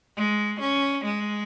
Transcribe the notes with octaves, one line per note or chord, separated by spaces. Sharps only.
G#3
C#4
G#3